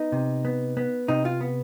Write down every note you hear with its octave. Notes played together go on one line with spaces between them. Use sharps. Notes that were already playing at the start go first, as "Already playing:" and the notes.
Already playing: B3 D#4
C3
B3
B3
C3 D#4
F4
B3